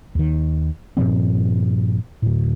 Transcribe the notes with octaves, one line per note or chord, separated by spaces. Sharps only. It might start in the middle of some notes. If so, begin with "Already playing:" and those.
D#2 D#3
G2 A#2 F3 C4
D2 A2